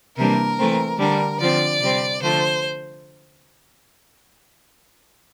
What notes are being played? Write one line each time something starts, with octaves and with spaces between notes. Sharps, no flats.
C3 E3 G3 A#3 D4 A#4
E3 A3 C4
D3 G3 D4 A#4
D3 F3 C4 D5
C3 G3 C4
D3 F3 A3 C5